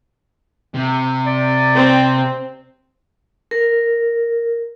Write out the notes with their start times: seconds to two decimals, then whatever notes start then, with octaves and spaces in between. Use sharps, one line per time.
0.74 C3
1.27 D5
1.75 C4
3.51 A#4